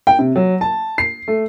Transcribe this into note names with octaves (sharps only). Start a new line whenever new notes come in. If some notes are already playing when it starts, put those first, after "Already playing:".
G5
C3
F#3
A5
C7
A3